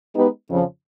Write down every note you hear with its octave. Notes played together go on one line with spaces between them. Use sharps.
G#3 B3 D#4 G4 B4
F2 C#3 F3